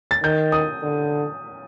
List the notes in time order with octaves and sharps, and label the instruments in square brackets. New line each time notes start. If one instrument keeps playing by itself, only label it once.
[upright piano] A6
[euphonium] D#3 [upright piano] G6
[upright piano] D#6
[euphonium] D3